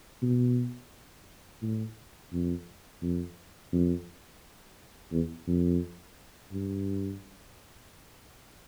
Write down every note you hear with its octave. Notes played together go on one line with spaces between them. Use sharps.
B2
A2
F2
F2
F2
E2
F2
G2